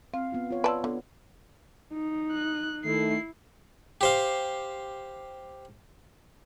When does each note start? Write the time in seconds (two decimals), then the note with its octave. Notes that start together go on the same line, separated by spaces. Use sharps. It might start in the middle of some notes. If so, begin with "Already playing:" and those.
0.14 C4 F5
0.32 B3 F4
0.51 F4 C#5
0.64 B4 D5 A5 C6 E6
0.84 D3 B3
1.93 D#4
2.33 F#6
2.85 D#3 A3 E4 C7
4.01 G4 C5 F5